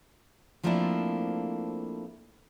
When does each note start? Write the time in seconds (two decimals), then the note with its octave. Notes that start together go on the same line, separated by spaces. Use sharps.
0.63 F3 A3 A#3 C4 D4 E4